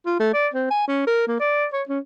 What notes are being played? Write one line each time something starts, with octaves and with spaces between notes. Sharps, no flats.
F4
A3
D5
C4
G#5
C#4
A#4
A#3
D5
C#5
C#4